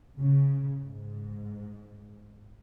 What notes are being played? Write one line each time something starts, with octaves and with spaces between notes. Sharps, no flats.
C#3
G#2